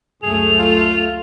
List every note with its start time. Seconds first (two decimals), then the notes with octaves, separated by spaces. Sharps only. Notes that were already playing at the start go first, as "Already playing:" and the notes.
0.23 C#2 F#2 A3 G#4 F7
0.59 F4